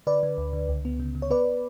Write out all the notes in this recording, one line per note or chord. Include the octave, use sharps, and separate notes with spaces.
D3 B4 D5
D3
D2
D3
C#2
B3
C#3
C#3
C#5
B3 B4 D5